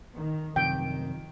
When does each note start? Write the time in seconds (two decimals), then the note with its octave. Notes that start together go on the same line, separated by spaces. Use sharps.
0.16 D#3
0.56 F#2 C3 D#3 F3 G5